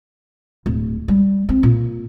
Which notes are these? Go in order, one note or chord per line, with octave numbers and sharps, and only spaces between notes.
D1
G3
C4
A#2